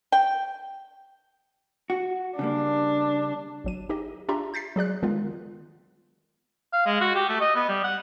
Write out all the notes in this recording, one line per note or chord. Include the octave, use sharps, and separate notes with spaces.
G5
F#4
C#3 G3 A#3 D4
G#1 F#3 D#7
D#4 G4 G#4 D#5
D4 F4 G4 E5 A#5 C6
G6 A6 B6 C7
F#3 G#4 D5 F#6
D3 D#3 G#3 B3 F4
F5
G#3
F#4
G4
A3
D#5
B3
G3
F#5